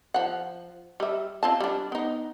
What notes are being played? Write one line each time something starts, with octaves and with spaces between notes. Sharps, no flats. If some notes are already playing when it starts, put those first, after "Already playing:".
F3 F#5
G3 E5
C4 F4 A5
G3 D4
B3 D#4